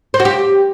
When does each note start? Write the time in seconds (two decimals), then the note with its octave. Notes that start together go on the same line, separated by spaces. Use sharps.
0.14 C5
0.20 F#4
0.25 G4